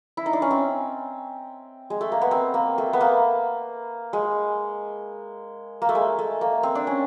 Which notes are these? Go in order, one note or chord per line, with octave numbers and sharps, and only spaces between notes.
E4
D#4
D4
C#4
C4
G#3
A3
A#3
B3
C4
A#3
A3
B3
A#3
G#3
A#3
A3
G#3
A3
A#3
C4
D4
C#4